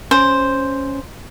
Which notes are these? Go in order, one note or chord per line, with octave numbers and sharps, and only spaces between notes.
C#4 C5